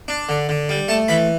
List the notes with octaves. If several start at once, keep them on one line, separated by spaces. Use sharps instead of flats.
D4
D3
D3
G3
A3 A5
E3 B5